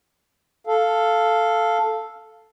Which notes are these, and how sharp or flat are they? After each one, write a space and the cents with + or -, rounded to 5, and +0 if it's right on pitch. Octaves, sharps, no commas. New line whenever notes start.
A4 +0 F5 +0